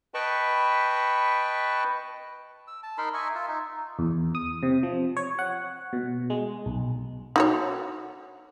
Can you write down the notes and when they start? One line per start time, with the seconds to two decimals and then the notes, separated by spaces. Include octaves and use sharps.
0.14 B4 D#5 G5 A5 B5 C#6
2.67 E6
2.83 A5
2.98 D#4 A#4 B5 C6
3.14 D#5 E5 G#5 C#6
3.35 F4 E5
3.48 D#4
3.99 E2
4.35 D#6
4.63 C3
4.83 F3
5.16 C#5
5.39 F#5
5.93 B2
6.30 G#3
6.66 B1
7.36 D#4 F#4 C#5